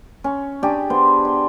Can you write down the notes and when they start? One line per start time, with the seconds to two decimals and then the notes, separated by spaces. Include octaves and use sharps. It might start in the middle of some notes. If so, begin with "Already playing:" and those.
0.24 C#4
0.63 D4 G4 G#4
0.90 B3 B4 C5
1.25 C6